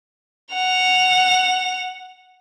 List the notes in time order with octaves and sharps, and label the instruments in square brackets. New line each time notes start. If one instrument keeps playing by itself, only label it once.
[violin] F#5 F7